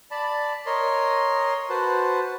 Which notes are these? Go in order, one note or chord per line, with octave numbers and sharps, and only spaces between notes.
D5 A5 B5
A#4 C#5 D#5 C6
F#4 B4 C5 A5